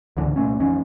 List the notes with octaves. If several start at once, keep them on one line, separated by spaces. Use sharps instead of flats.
C#2 G#2 D3 E3
C2 A#2 A3 C#4
A1 F2 D#3 C#4